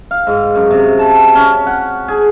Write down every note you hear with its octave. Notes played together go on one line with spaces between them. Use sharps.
F5
G#2
F#2
C3
A5
C#4
F#5
G#4